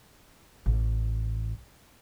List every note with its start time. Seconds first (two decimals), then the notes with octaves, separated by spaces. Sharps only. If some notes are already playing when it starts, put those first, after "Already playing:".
0.66 A1